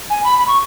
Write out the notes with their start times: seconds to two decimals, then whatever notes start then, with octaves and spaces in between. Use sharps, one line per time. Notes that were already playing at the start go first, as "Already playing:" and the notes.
0.10 G#5
0.24 B5
0.38 B5
0.47 C#6